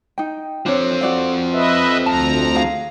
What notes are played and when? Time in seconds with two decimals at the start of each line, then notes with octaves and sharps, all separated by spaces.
0.18 D#4 G5
0.66 F3 C4 D4 C#5
1.01 F#4 D5 F5
1.52 B4 D#5 E5
2.06 D2 A5 A#5
2.55 G#4 F5